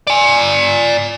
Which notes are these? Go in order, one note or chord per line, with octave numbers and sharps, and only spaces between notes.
D5 G#5